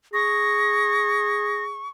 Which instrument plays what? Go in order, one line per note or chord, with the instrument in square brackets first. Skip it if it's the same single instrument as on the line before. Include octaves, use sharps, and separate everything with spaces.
[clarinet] G#4 [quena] C#6 [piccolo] A#6